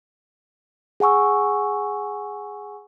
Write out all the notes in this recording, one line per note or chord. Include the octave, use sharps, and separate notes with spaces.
G#4 F#5 G#5 C#6 E6